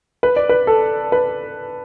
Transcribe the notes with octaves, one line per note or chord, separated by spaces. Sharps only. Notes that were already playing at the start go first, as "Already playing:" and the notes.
B4
D5
B4
A4
B4